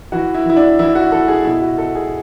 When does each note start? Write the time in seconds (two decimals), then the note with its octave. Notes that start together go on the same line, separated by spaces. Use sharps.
0.12 E3 F#4
0.34 E4
0.45 E3 E4
0.56 D4
0.79 E3 E4
0.95 F#4
1.12 E3 A4
1.28 G#4
1.44 B2 E4
1.61 F#4
1.78 B2 A4
1.95 G#4